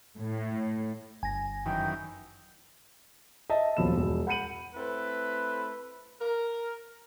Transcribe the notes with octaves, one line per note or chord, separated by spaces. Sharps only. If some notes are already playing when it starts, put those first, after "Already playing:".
A2
G1 G#5 A#6
F#2 D#3 E3 G5
D#5 E5 A5
D#1 B1 F3 B5 E6 E7
E1
F#5 B5 G6 C#7 D#7 F#7
A3 C4 E4 A4 B4
A#4